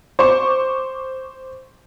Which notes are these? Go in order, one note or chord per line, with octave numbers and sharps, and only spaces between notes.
C5 C#6 D6